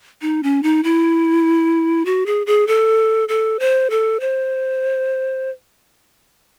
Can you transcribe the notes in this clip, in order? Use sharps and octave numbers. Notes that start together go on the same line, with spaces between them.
D#4
C#4
D#4
E4
F#4
G#4
G#4
A4
A4
C5
A4
C5